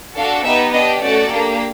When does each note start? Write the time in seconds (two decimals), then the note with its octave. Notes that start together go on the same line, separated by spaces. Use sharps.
0.16 D4 F#4 A4 F5
0.44 B3 D#4 G4 E5
0.72 D4 G4 D#5
1.01 A3 C#4 F#4 A4 D5
1.29 A#3 D4 G4